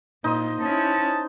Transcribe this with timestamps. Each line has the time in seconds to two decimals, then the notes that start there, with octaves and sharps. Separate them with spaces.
0.24 A#2 D#4 C5 D#5
0.61 C#4 E4 A5